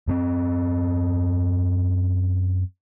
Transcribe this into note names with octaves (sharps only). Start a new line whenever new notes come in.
F#2 B3 C4